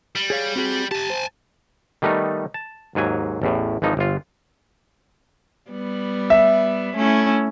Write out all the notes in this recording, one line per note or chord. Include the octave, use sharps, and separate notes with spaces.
G3
G#4 C#5 F5
C4 F#4 G#4
G4 G#5 A5
C5
D#3 G3 A3 B3 D#4
A5
D#2 G#2 F#3 G#5
A1 E2 A2
G#1 E3 F3 D#4
G1 F4
G3 B3
E5
A3 C#4 E4